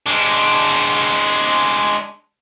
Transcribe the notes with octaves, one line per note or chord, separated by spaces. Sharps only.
G#3 D4